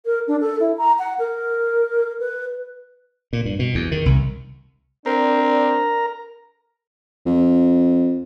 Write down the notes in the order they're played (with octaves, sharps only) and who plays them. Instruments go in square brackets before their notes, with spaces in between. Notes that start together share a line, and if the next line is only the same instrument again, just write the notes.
[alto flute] A#4
D4
A4
E4
A#5
F#5
A#4
B4
[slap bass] A#2
G2
B2
E2
D#3
C2
[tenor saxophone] C4 [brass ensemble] D4 D5 [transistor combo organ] A#4 A#5
[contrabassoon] F2